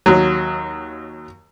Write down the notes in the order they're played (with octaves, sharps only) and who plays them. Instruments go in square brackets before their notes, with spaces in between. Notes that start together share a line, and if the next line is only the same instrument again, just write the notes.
[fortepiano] D#2 F#3